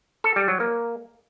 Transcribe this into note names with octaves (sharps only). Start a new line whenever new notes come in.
A4
G3
F#3
A#3